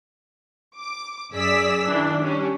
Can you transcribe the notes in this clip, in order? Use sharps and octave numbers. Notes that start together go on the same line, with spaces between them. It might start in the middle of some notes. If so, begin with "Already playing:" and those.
D6
F#2 G#4 D5 E6 B6
D#3 E3 D4
G3 C#4 D4